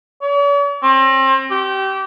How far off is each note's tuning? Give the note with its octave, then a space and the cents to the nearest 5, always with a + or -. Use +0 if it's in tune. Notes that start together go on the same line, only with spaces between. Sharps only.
C#5 +45
C4 +35
G4 -25